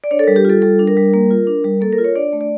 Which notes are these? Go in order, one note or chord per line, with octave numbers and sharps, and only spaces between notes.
D5
D4 C#5
A4
G3 A#4
G4
F4 A4
G3 A4
D4
A#4
G3
A#3
F4
D4
G3
A#3 A4
A#4
F4
C#5
D4 D5
A3
D5